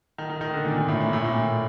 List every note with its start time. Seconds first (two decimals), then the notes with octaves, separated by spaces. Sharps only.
0.18 D#3
0.30 D#3
0.41 D#3
0.53 D3
0.65 A#2
0.77 A#2
0.88 A2
1.00 A#2
1.13 A2
1.24 A#2